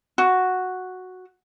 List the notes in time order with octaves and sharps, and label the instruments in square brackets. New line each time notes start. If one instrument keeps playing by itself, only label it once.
[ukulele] F#4